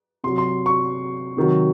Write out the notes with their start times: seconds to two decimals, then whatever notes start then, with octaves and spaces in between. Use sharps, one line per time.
0.24 C3 F#3 C6
0.38 C6
0.66 C#6
1.37 C3 D#3 F#3